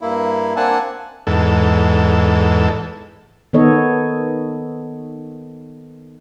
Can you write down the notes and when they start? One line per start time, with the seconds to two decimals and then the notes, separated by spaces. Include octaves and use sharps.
0.01 G2 A#3 E4
0.56 A#3 C4 D4 F#5 G#5 A5
1.27 E2 G#2 A4
3.53 D#3 B3 A4 C#5 D#5